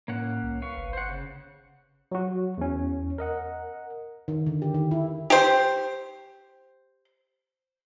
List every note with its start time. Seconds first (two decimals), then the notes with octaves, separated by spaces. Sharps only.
0.08 A2 A#3 C#4 F#5
0.43 C2
0.62 B4 F5 C#6
0.77 G1
0.93 C5 F#5
1.09 C#3
2.12 F#3 F#4
2.58 E2 C#4
3.18 A#4 D#5 F#5
4.28 D#3
4.47 D3
4.62 G4
4.74 D#3
4.91 E4
5.30 G4 C5